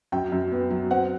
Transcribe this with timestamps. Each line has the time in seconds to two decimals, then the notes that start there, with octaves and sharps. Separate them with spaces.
0.12 F#2 G5
0.32 F#2
0.52 B3
0.71 F#3
0.91 C4 F#5